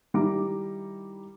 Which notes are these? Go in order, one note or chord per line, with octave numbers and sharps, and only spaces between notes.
D#3 G3 E4 A#5 D6